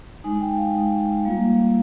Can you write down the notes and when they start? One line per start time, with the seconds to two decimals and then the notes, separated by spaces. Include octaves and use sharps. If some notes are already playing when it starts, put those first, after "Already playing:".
0.24 G#3 D#4 G#5
0.41 G5
0.58 F5
0.75 G#3 D#4
1.25 G3 A#3 F4 F5